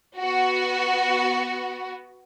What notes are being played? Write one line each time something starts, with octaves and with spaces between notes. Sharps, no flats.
B3 F#4